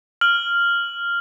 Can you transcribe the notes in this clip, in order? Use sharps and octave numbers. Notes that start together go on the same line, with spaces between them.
F6 F#7